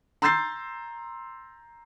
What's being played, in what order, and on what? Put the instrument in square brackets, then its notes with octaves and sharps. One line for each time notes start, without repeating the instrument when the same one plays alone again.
[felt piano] A#5 C6 E6 G6 A6 C7